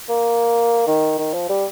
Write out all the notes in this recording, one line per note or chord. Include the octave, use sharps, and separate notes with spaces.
A#3
D#3
D#3
F3
G3